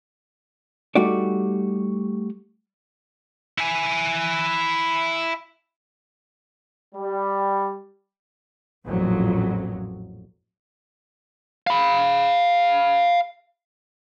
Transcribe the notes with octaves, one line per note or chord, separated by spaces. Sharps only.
G3 A3 D#4 F#4 G4 D5
E4 G#5
G3
A1 F2 A#2 F#3
F5 B5